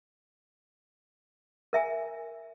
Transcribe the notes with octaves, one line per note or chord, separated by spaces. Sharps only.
A#4 E5 G#5